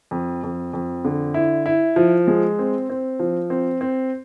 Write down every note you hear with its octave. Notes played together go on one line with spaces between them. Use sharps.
F2
F2
F2
D3
E4
E4
F3
G#3
C4
C4
F3
C4
C4